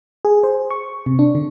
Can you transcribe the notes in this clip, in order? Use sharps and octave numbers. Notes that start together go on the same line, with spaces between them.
G#4
C5
C#6
C3
D4
D3